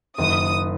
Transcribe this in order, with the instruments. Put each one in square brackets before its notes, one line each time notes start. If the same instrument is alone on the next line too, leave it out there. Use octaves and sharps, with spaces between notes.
[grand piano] F#1 F#2 D#3 [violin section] D#6